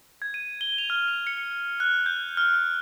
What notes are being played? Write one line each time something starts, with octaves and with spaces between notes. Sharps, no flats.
G#6
D#7
G7
F7
F6
F7
C#7
F#6
G6
F6